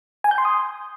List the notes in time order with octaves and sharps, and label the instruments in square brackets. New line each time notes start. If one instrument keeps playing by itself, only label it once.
[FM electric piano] G#5
G6
C6
D#6